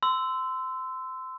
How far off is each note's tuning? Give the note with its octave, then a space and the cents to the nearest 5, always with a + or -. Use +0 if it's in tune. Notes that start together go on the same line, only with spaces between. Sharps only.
C6 -25 E6 +0